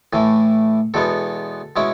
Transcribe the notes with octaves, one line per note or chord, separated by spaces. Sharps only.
A2 E3 A3
E2 B2 G#3 B3 A4
B2 G#3 C#4 E4